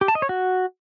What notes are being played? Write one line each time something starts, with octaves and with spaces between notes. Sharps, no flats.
G4
A5
D#5
C#5
F#4